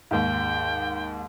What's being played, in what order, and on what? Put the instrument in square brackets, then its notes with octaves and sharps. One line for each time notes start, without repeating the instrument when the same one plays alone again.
[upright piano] D#2 G#2 [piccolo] G5